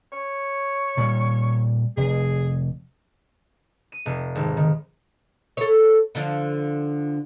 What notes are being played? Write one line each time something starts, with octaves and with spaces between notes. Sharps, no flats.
C#5
A#2 G3
F1 G#4
D#7
F1
G#1
D#3
A4 C#5
D3 F3 D4